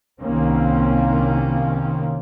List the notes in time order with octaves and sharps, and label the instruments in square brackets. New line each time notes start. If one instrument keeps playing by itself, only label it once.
[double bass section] C2 D#3 A#3 C4 C#4